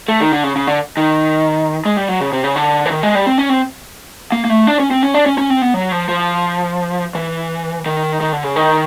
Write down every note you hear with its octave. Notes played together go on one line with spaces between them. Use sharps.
A3
D#3
D3
C#3
C#3
D3
D#3
G#3
G3
F#3
C#3
C3
C#3
D3
E3
D#3
G#3
G3
C4
C#4
C4
A#3
A#3
A3
D4
C#4
C4
C#4
D4
C#4
C#4
C4
B3
F#3
F3
F3
E3
D#3
D#3
D3
C#3
D#3